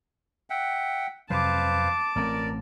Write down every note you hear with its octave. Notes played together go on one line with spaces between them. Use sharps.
E5 F#5 G5
F2 C3 F#3 B4 C5 F5 A5 D6
A1 A3 C4 A#4 D5